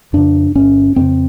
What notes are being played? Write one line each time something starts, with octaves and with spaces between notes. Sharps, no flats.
F2 C#3 D4
G1 C#4
F2 C#3 C4